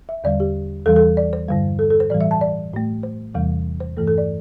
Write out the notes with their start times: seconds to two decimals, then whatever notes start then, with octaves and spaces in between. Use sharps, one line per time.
0.09 E5
0.24 E2 D3 G3 D5
0.40 G4
0.86 E2 E3 G3 A4
0.96 A4
1.17 D5
1.33 C5
1.48 G2 D3 G3
1.79 A4
1.90 A4
2.00 C5
2.10 A2 E3 G3 D5
2.21 E5
2.31 A5
2.41 D5
2.73 A2 A3
3.03 C5
3.34 E2 C3 E3 G3
3.80 C5
3.97 G2 E3 A3 A4
4.07 A4
4.18 D5